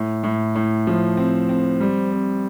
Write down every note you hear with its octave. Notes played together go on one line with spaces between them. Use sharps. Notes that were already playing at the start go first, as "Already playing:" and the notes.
Already playing: A2
A2
A2
F3
C4
C4
G3
C4